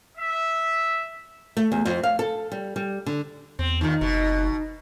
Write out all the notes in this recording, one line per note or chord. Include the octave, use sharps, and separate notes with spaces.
E5
A3
E2
F2
F5
A4
G3
G3
D3
E2 C4
D#2 A#2 D#3 D#4
F#1 B2